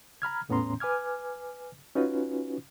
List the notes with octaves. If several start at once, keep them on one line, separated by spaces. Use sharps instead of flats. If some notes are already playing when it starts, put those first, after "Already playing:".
A#5 B5 F6 G#6
E2 A2 B3 C#4 A#5 C6
B4 G#5 D6 F6 G#6
C#4 D#4 F4 F#4 B4